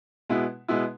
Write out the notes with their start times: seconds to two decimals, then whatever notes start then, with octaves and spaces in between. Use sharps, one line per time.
0.29 B2 G#3 B3 E4
0.68 B2 G#3 B3 E4